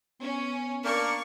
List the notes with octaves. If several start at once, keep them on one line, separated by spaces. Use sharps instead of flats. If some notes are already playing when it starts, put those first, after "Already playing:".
B3 C#4
A#3 D4 A#4 C#6